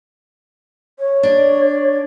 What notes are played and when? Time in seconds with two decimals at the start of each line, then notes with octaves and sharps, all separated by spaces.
0.99 C#5
1.23 D4